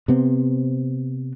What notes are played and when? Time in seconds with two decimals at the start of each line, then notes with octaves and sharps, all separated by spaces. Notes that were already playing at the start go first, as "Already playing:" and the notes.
0.08 C3 B3 C4